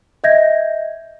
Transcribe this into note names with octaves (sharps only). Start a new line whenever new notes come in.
D#5 E5 G6 G#6 A#6